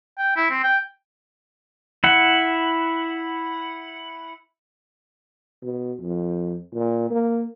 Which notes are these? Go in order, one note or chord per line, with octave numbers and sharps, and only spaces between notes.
G5
E4
C4
G5
E4 F#5
B2
F2
A#2
A#3